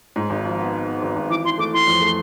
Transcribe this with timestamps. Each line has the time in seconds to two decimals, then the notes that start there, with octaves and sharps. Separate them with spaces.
0.16 G#2
0.30 G#1
0.44 F3
0.59 B3
0.72 B3
0.87 B3
1.02 G#1
1.16 G#1
1.30 E3 D6
1.45 E3 C6
1.58 A3 D6
1.73 E3 C6
1.87 F2
2.01 A3